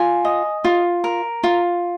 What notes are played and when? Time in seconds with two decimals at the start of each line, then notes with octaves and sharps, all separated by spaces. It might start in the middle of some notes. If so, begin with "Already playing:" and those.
Already playing: F4 G#5
0.25 D#5
0.65 F4
1.04 A#4
1.44 F4